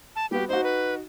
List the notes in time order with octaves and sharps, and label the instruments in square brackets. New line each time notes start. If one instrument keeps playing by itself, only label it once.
[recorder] A5
[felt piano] G3 B3 F#4 [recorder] G4
[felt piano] D#4 F#4 [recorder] C5
[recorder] B4